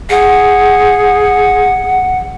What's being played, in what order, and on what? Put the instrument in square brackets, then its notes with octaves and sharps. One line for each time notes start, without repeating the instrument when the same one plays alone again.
[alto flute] G#4 [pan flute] F#5